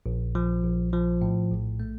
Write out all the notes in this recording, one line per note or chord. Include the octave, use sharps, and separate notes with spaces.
A#1
F3
A#1
F3
A2
A#1
A3